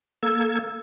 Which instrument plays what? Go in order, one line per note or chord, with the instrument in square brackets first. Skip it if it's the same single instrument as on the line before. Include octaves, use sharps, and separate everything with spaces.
[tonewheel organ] A#3 A4 G#6 [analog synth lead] E6